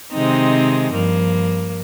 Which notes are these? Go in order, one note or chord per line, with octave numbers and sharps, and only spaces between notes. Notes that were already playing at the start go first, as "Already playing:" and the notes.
C3 D#3 G#3 C4 D#4
G2 F3 A#3